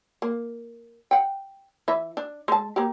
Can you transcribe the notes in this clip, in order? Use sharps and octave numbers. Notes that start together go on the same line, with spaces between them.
A#3
F#5 G5
E3 E5
D4
G#3 A5
A#3 G4